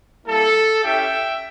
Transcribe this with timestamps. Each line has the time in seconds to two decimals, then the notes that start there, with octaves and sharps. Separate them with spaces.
0.25 G3 A#3 E4 A4
0.83 C#4 E4 G4 E5 G5